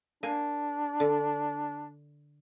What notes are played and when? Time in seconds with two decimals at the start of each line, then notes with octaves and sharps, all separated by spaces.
0.23 A#3 D4 G#5
1.00 D3